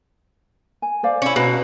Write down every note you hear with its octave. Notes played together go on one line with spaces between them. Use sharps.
G#5
C5 D5 F5
C#4 E4
B2 C#4 A#5